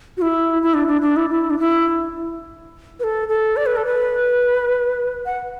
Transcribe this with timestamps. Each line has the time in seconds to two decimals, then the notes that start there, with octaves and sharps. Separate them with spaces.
0.17 F#4
0.22 E4
0.62 E4
0.74 D4
0.88 D4
1.02 D4
1.17 E4
1.30 E4
1.50 D4
1.59 E4
3.00 B4
3.04 A4
3.29 A4
3.57 D5
3.66 B4
3.76 A4
3.86 B4
5.26 F#5